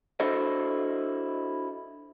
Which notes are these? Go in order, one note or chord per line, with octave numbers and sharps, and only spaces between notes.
D4 E4 F#4 A4 C5 D#5